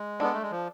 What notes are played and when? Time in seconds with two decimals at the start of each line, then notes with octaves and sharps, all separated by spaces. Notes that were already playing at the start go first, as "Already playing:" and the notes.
Already playing: G#3
0.20 B3 D4 A4 D5
0.33 A3
0.42 G#3
0.51 F3